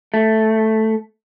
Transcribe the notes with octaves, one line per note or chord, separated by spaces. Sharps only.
A3